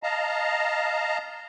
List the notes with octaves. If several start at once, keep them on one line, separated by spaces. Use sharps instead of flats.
D#5 F5 A5 A#5